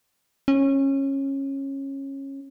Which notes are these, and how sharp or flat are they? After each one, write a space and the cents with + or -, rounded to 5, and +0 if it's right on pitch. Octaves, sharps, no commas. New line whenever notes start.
C#4 -20